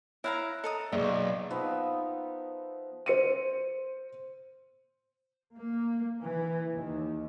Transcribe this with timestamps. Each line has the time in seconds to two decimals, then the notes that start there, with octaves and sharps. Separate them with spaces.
0.24 E4 C#5 E5 F5 A#5 E6 F#6
0.64 A4 D#5 A#5 D#6
0.93 B1 G2 A#3 G#4 D5 E5
1.50 F3 B3 D#4 E5
3.06 C5 C#7 D#7
5.55 A#3
6.24 E3
6.74 D#2